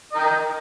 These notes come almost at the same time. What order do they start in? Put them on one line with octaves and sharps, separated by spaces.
D#5 A#4 G5